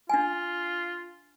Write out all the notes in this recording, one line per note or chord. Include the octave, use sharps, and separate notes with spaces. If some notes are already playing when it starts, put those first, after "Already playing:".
D4 F4 G#5